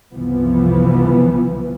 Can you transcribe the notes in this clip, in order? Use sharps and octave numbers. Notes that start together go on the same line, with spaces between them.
F#1 C2 E3 F3 B3